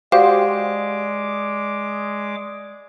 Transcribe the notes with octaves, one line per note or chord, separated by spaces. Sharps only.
G#3 F#4 G4 C5 D5 F5 D6